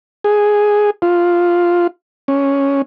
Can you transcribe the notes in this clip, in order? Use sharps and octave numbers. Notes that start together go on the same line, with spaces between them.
G#4
F4
C#4